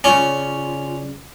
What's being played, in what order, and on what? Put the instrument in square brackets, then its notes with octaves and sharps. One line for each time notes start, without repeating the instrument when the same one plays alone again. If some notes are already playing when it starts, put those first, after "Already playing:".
[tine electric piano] C#3 D5 [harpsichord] C#4 [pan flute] F4